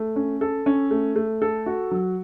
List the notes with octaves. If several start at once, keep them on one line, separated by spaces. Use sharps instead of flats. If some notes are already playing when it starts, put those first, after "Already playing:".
Already playing: A3
C#4
A4
C#4
A3
A3
A4
F#4
F#3